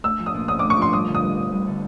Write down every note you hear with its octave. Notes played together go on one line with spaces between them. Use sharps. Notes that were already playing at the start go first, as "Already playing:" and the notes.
A3 E6
F3
D#6
A#2
C#4 D#6
D6
A3
C#6
F3 C6
G3 D#6
D3
D#6
G2
C4
G3
D3